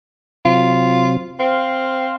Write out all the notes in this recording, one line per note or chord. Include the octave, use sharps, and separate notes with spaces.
C3 F#3 C4 F4
C4 F5 C6